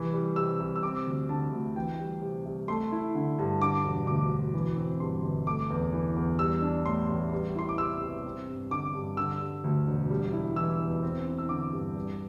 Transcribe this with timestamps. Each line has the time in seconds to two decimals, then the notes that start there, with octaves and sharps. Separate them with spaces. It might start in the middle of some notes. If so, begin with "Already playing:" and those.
Already playing: C2 E3
0.13 G3
0.36 C3 E6
0.59 C2
0.76 E6
0.83 C4 D6
1.06 D2
1.29 D3 A5
1.52 D2
1.75 E3 G5
1.99 G3
2.22 C3
2.45 C2
2.68 A3 C6
2.92 E4
3.15 D3
3.38 G2
3.61 D3 D6
3.84 E1
4.07 D2 D6
4.31 E1
4.54 E3
4.77 C4
5.00 G2 C6
5.23 G1
5.47 A3 D6
5.70 E2
5.93 E3
6.16 E2
6.39 G3 E6
6.62 D4
6.85 A2 C6
7.09 A1
7.32 G3
7.56 E4 C6
7.69 D6
7.78 C3 E6
8.02 C2
8.24 C4
8.48 G2
8.70 D3 D6
8.94 G2
9.17 D3 E6
9.41 G3
9.64 D2
9.87 E1
10.10 G3
10.33 E4
10.56 E3 E6
10.80 E2
11.03 C4
11.26 E4
11.38 E6
11.49 D3 D6
11.72 G2
11.96 G3